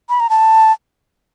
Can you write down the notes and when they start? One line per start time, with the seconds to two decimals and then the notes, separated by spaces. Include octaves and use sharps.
0.09 B5
0.20 A#5
0.30 A5